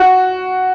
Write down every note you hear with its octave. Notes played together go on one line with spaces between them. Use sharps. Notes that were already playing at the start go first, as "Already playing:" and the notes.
Already playing: F#4